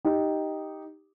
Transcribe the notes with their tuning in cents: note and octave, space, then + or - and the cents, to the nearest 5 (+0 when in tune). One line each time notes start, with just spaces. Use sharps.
D#4 +0 G4 +0